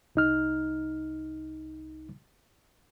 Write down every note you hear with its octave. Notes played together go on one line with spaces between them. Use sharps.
C2 D#4 F6